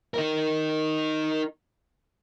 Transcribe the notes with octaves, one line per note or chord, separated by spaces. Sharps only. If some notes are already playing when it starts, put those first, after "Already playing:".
D#4 A#4